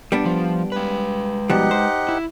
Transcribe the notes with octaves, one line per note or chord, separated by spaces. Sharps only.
G3 B3 D4
F3
G#3 B4
B2 F3 G3 D#4 G4 F#5
C5
E4